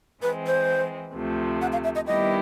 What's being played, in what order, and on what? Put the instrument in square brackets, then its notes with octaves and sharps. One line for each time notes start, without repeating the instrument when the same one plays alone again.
[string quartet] E3 G#3 C4 [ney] B4
[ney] C5
[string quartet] D2 C3 F3 A3
[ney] F#5
F5
E5
D#5
[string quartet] D#3 G3 B3 E4 G4 [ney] D#5